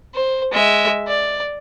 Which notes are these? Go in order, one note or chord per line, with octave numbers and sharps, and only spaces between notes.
C5
G#3 E5
D5